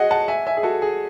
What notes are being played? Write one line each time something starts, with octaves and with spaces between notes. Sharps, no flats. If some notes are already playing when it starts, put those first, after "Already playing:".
Already playing: F#4 G#4 D#5 F#5
F#5 A5
E5 G#5
E5 G#5
G#4
F#4 A4
G#4